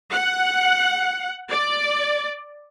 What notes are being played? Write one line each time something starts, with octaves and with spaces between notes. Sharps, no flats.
F#5
D5